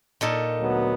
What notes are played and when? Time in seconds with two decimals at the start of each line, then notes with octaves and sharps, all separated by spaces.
0.21 A#2 D#4 A4
0.60 D2 F#3 B3